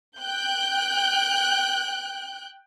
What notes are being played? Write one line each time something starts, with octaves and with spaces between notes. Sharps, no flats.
G5 F#6 G6